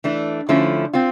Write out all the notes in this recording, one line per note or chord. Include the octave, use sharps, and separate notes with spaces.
E3 A3 D4
D3 F3 A3 C#4 E4
C4 F4